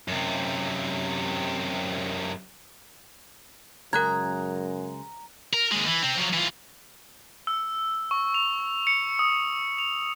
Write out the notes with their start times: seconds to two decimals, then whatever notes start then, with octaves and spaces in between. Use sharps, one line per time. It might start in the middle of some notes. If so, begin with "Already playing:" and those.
0.08 F#2 C3
3.93 F#2 C#3 G#3 A#4 A#5 F#6 G#6
5.53 A#4
5.71 D#2 G#3
5.86 E3
6.02 C3 C4
6.16 F3 F#3
6.33 E3 F4
7.47 E6
8.11 C#6
8.34 F7
8.87 C#7
9.19 D#6
9.78 F7